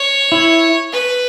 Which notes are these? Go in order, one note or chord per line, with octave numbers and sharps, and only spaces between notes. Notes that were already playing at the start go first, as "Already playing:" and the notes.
Already playing: C#5
E4
B4